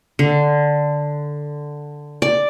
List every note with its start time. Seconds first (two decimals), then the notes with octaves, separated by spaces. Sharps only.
0.19 D3
2.22 D5